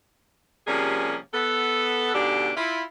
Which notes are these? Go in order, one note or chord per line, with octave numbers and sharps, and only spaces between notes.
C3 F3 G3 A#3 C#4 G#4
B3 A4
G#2 B2 D3 D4 G4 D5
E4 F4